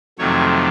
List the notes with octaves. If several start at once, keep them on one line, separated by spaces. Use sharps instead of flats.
F2 C3 D#3 F#3 A3 C#5